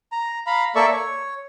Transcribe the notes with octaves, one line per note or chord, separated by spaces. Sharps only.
A#5
F5 A#5 B5
A#3 A4 D5 E5 C#6
C#5